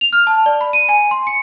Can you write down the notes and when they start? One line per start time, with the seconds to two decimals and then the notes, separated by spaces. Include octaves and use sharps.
0.01 F7
0.13 F6
0.27 A5
0.46 D5
0.61 B5
0.73 D#7
0.89 G#5
1.11 C6
1.27 C#7